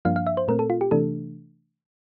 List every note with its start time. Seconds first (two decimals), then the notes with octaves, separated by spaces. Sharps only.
0.05 G2 F3 A#3 D4 F5
0.16 F5
0.27 E5
0.37 C5
0.48 A#2 A3 C4 A#4
0.59 A4
0.70 F4
0.81 G4
0.91 C3 E3 A3 D4 A4